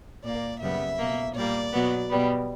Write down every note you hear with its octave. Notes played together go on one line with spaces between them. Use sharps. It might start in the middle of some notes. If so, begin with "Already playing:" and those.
A#2 A#3 D5
F#2 C#3 G3 B3 E5
B2 A#3
A#2 G3 A#3 D5
B2 F#3 B3
B2 G3 B3